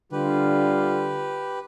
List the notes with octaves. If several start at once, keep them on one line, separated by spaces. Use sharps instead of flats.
D3 G3 F4 G4 B4